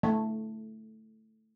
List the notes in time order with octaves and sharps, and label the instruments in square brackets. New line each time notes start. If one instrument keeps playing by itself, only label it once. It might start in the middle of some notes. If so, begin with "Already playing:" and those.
[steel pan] A3